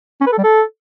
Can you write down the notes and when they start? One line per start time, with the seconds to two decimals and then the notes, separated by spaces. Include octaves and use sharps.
0.21 C#4
0.27 B4
0.32 A4
0.38 G3
0.44 A4